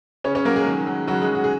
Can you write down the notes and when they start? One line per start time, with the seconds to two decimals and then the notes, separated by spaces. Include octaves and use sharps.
0.24 C#3 C#4 C#5
0.35 C#4 C#5
0.45 F#3 A#3 A#4
0.56 G#3 G#4
0.66 D#3
0.87 F#3
1.07 C#3 F#3 F#4
1.22 G#3 G#4
1.28 F#3
1.35 F#4
1.44 G#4